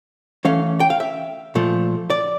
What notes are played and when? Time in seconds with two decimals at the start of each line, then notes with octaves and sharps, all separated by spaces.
0.45 E3 A3 C#4 F5
0.80 G5
0.90 F5
1.00 E5
1.55 A#2 F3 A3
2.10 D5